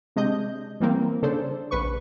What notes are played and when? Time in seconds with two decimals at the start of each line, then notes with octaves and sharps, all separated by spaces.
0.16 C3 G#3 D4 D#5 G6
0.80 E3 G3 A#3 C4
1.22 C#3 D4 A4 C5
1.71 A#1 B4 C#6